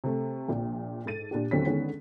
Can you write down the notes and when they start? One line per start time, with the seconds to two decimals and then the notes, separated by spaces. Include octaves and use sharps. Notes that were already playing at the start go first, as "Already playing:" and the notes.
0.04 C3 A3
0.48 A#1 A#2
1.06 G#2 A4 A6 D#7
1.31 A#2 D4 G4
1.51 D#2 D3 F#3 C4 C#4 B6
1.66 D3 D#3 G#3 B3 C#4